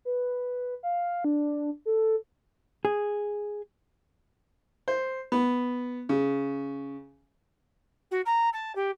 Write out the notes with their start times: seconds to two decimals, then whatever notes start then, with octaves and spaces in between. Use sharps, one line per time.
0.05 B4
0.83 F5
1.24 D4
1.86 A4
2.85 G#4
4.88 C5
5.32 B3
6.09 C#3
8.11 F#4
8.25 A#5
8.53 A5
8.75 G4